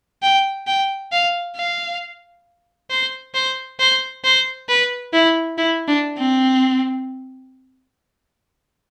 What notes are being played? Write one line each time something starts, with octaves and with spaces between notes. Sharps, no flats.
G5
G5
F5
F5
C5
C5
C5
C5
B4
E4
E4
D4
C4